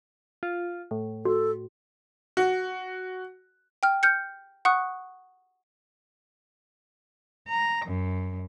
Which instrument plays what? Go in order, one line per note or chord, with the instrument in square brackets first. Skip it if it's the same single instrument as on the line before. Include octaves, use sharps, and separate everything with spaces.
[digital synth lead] F4
A2
[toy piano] F#4 [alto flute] A4
[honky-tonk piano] F#4
[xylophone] G5 F6
F6 G6 C#7
F#5 C#6 D#6 F#6
[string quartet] A#5
F#2